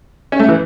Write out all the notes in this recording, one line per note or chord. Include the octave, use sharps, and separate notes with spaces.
C#4
A3
E3